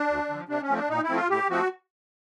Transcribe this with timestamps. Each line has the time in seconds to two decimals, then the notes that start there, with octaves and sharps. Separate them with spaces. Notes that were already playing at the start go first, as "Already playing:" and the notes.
Already playing: D4
0.09 D2
0.29 D3 F3
0.49 C3 D4
0.62 C#4
0.69 F3 A3 C4
0.77 D4
0.89 A#2 D#4
1.04 E4
1.09 F3 A3 C4
1.16 F4
1.29 A2 G4
1.50 F3 A3 C4 F#4